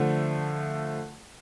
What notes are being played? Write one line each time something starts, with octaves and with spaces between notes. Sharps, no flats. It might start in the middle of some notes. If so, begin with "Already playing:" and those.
Already playing: D3 F3 A3